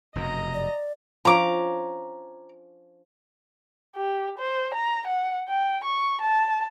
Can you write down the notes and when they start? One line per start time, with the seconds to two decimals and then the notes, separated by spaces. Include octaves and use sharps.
0.16 F1 F#2 B2 D#5 A#5
0.54 D5
1.25 F3 C#4 D4 A#5 D6
3.96 G4
4.39 C5
4.75 A#5
5.07 F#5
5.49 G5
5.84 C#6
6.21 A5